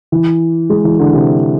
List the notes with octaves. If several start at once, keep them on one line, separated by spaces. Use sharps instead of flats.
E3
G#3
E3
D3
C3